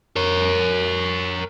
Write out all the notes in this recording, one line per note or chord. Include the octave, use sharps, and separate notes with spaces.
A#4 C#5